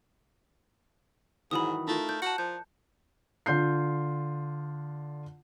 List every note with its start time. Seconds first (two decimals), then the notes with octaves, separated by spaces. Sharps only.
1.51 G#2 D#3 E3 F#3 B5 D#6
1.87 A3 D#4 F4 A#4
2.09 D5 G6
2.22 F#4 A5 F#6 C#7
2.38 F3 G6
3.46 D3 F4 G6 C7